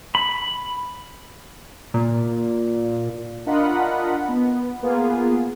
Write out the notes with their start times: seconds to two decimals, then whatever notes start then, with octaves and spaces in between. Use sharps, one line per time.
0.15 B5
1.94 A#2
3.46 D4 F4 A#4 D#5 F#5 B5
4.28 B3
4.82 A#3 B3 F4 G#4